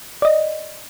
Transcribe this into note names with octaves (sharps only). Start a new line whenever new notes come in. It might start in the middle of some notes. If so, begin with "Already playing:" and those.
D5 D#5